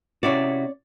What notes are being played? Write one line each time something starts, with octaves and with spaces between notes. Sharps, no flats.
C3 C#4 E4 F#4 C#5 D5